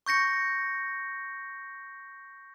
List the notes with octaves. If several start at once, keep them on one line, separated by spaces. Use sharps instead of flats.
C#6 G6 A#6 C#7